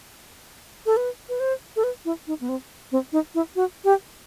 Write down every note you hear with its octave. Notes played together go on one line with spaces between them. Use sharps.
A4
B4
B4
C5
A4
B4
E4
D#4
B3
C4
C4
D#4
E4
F#4
G4